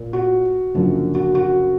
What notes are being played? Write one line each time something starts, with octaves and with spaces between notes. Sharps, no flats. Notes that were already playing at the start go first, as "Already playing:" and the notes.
Already playing: A#2
F#4
F#1 F#2 D3 F3
F#4
F#4